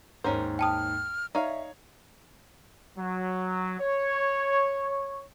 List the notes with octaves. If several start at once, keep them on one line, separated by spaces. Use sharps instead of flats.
D#2 G#2 C#4 A#4 C5
G5 A5 D#6 F6
D#4 C#5 D5 E5 F5
F#3
C#5